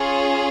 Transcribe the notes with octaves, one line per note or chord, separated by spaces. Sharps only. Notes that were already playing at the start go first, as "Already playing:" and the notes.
Already playing: C#4 F4 G#4